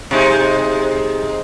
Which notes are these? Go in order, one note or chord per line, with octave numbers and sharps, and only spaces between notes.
C3 G#3 D#4